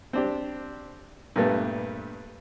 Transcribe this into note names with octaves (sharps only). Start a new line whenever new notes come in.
C4 D4 G4
G2 A#2 G3 A3 B3